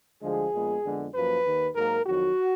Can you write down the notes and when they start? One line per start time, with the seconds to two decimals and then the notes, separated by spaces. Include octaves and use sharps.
0.22 D2 D3 F3 G#3 G#4
0.54 A#1 A#2 G#3 B3
0.84 F2 D3 G#3 B3
1.14 F#2 F3 A#3 B4
1.45 D#2 D#3 A#3
1.75 G#2 F#3 A#3 A#4
2.06 F2 D#3 F#3 F#4